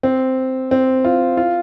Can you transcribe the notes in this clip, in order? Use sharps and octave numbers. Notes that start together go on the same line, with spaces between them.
C4
C4
F4
F4